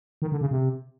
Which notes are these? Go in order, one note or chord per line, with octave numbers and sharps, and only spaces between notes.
D#3
D3
C#3
C3